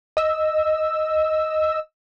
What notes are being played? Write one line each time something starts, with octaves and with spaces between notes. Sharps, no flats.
D#5 E6